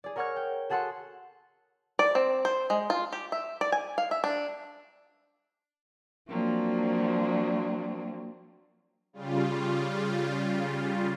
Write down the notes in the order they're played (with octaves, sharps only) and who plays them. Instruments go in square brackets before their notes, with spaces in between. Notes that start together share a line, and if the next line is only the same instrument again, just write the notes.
[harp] G#4 D5
A#4 C#5 F#5 C#6 F6 G#6
G5
F#4 G#4 A4 F#5 C6
[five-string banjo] D5
C4
C5
G#3
F4
G4
E5
D5
G#5
F5
E5
D4
[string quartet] F3 F#3 A#3 C4 D4
[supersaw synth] C#3 G3 F4